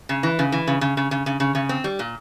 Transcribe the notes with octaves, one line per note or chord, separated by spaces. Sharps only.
C#3
E3
C#3
E3
C#3
C#3
C#3
C#3
C#3
C#3
C#3
C4
G3
A#2